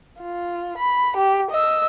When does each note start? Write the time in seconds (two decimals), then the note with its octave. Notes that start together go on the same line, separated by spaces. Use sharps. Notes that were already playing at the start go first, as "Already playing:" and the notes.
0.20 F4
0.78 B5
1.17 G4
1.51 D#5 E6